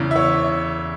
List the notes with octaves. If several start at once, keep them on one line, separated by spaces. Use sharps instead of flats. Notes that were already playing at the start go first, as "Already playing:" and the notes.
Already playing: E2 C#3 E3
E5
C#5